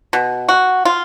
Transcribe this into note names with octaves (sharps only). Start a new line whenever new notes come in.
B2
F#4
F4